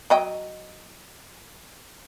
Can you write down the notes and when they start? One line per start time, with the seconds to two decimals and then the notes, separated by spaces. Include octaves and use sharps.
0.10 F#3 D#5 G5